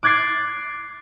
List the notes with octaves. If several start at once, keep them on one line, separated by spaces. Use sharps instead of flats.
D6 F#6 G#6 A6 C7